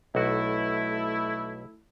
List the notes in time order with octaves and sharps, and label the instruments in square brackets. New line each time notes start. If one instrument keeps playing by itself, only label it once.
[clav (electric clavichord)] B1 F#4 [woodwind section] A3 E4